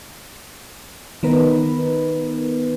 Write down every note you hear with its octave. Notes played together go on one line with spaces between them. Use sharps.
D#3 B3 D#4 A#4 B4